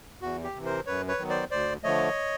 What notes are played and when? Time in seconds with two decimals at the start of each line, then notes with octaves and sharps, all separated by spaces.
0.22 E2 F#4
0.44 G4
0.55 C3 E3
0.65 A#4 C5
0.86 F#2 B4 C#5
1.08 B4 C#5
1.19 D#3 F#3 B3
1.29 C5 D5
1.51 D2 C5 D5
1.83 D3 F3 A3 C#5 D#5